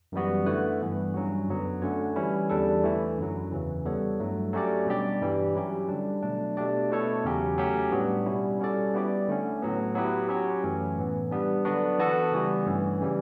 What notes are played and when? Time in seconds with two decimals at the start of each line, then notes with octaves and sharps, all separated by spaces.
0.12 F#2 E3 G3 B3 F#4
0.46 D3 A3 E4 B4
0.81 G2 E3 B3
1.14 G2 F#3 C#4 F#4
1.48 F#2 D3 F#3 B3
1.82 D3 A3 C#4 F#4 C#5
2.16 E3 G3 C#4 E4
2.50 E2 D3 G3 D4 A4
2.83 E3 A3 E4
3.18 F#2 D3 F#3
3.52 E2 C#3 E3
3.85 G3 B3 E4 A4 C#5
4.20 G2 F#3 A3
4.53 F#3 A3 C#4 G4 D5
4.87 B2 G3 D4 G4 D5
5.21 G2 E3 G3
5.55 F#3 C#4 E4 G4
5.88 D3 G3 D4
6.23 B2 F#3 A3 D4
6.57 B2 A3 D4 G4 D5
6.90 B2 A3 E4 A4 C#5
7.25 E2 C#3 F#3 C#4 G4
7.58 F#3 A3 C#4 G4
7.92 A2 G3 B3 D4 F#4
8.26 B2 G3 C#4 E4
8.59 G3 C#4 F#4 A4 D5
8.93 G3 B3 E4 G4 D5
9.28 D3 A3 C#4
9.62 A2 F#3 B3
9.95 F#3 B3 E4 G4 B4
10.29 F#3 C#4 G4 C#5
10.63 F#2 E3 A3 C#4
10.97 A2 E3 B3
11.31 G3 B3 D4
11.65 D3 F#3 B3 D4 F#4
11.99 E3 B3 F#4 A4
12.32 C#3 E3 G3 B3
12.67 G2 E3 A3 C#4
13.01 C#3 E3 G3 C#4 G4